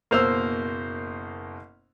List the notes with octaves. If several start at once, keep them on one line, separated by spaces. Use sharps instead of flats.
F#1 B2 A#3 C5 E6 F7